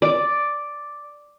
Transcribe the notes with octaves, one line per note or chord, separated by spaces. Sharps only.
D5